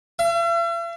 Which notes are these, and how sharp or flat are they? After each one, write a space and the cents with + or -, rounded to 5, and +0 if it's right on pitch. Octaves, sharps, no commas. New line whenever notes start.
E5 +45